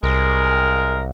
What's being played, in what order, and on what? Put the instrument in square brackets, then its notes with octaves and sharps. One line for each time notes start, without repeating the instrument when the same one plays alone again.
[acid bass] C2 [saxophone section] G#3 A#4